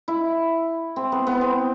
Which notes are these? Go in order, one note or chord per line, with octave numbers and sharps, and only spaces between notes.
E4
C4
B3
B3
C4